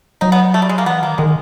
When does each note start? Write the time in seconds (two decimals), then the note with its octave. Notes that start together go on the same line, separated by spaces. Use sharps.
0.21 F#3 D#4
0.32 B3
0.54 A3
0.62 G3
0.69 G#3
0.78 A#3
0.86 E3 B3
1.02 D#3 A#3
1.18 D#3 G#3